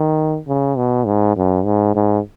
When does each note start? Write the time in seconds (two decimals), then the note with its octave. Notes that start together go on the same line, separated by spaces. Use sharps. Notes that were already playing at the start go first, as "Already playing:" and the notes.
Already playing: D#3
0.47 C#3
0.77 B2
1.06 G#2
1.36 F#2
1.65 G#2
1.95 G#2